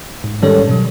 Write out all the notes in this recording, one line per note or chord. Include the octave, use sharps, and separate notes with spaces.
G#2
G#2 D#3 G3 C#4 A4 C#5
B2 F#3